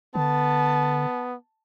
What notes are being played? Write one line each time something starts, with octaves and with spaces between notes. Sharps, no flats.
D3 B3 A5